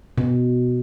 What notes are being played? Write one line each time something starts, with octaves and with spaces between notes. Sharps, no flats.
B2